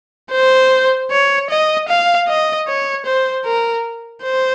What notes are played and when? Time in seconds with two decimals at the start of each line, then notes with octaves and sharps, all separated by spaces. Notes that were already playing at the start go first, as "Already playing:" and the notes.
0.32 C5
1.11 C#5
1.50 D#5
1.89 F5
2.28 D#5
2.67 C#5
3.06 C5
3.45 A#4
4.23 C5